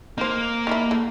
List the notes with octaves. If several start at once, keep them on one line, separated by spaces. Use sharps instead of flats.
A#3 D#4 A#4 C5
D#3 E3 E4
E3 A3